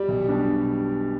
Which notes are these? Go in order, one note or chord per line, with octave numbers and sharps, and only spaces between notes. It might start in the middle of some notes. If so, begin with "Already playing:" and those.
Already playing: G3 G4
B1
B2 G3 D4